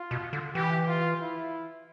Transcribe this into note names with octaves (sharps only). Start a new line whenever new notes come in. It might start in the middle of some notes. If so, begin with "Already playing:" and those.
Already playing: F4
B2
D3
E3 G4
F4
E4